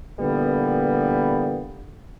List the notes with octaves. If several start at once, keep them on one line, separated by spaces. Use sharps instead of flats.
A#2 D3 E3 G3 A#3 B3